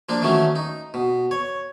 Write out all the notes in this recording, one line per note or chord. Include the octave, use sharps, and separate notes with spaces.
F3 A#3 D4
D#3 E3 F#3 A3 C#4
D#4
B2
C#5